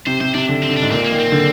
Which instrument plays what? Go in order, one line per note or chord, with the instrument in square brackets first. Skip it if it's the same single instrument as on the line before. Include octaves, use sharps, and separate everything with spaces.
[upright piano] C3 [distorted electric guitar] C5
[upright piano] C3 [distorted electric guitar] C5
[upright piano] C3 [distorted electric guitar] D4
[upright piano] D3
[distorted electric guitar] C4
[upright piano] D3
[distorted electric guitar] D4
[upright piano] G#2
[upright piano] A#2 [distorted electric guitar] C4
[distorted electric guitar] A#3
[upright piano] D#3
[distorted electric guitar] C4
[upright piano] D3